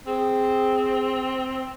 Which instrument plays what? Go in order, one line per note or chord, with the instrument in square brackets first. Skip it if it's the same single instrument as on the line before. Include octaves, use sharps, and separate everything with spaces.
[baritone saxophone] C4 [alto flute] G#4